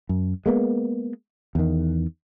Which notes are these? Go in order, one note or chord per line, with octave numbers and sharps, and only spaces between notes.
F#2
G#3 A#3 B3
E2 D#3